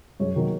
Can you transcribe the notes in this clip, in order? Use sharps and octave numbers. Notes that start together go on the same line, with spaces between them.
F#2 G#4 C#5
D#3 F#3 A#3